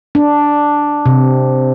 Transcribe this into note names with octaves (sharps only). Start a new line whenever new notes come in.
D4
C3